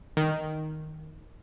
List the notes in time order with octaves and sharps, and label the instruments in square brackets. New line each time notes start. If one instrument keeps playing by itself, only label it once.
[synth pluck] D#3